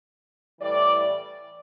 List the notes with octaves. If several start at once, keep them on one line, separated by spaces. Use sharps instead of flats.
A2 E3 G3 D5